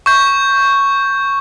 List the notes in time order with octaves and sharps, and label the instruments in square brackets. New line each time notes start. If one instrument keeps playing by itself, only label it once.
[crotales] C#6 G6